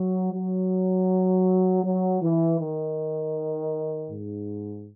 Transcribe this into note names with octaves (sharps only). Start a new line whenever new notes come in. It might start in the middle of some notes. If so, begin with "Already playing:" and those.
Already playing: F#3
F#3
F#3
E3
D#3
G#2